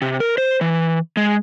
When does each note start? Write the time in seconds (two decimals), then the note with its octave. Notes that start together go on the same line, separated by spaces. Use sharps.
0.02 C3
0.20 A#4
0.38 C5
0.61 E3
1.17 G#3